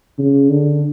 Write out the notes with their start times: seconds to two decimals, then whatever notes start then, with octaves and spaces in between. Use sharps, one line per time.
0.18 C#3
0.50 D3